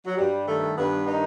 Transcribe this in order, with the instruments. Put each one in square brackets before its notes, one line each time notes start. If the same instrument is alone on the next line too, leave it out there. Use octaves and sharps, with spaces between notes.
[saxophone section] F#3
G2 G3
D#3 A3
G2 B3
D#3 D#4